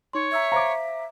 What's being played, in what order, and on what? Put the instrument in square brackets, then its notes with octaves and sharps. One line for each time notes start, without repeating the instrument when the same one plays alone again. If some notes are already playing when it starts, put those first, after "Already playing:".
[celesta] D#4 C6 [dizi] C#5
[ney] E5 [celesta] A#5 E6 G#6
[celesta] C5 F5 [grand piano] A#5 D6